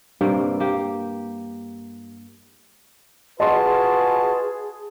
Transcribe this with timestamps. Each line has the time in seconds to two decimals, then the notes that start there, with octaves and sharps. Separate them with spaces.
0.21 G2 C3 A#3 G5
0.60 A#3 G4
3.40 F4 F#4 G#4 B4 D#5 A5 C6